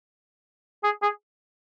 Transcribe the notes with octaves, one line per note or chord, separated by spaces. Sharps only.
G#4
G#4